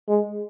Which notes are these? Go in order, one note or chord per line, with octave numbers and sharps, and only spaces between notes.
G#3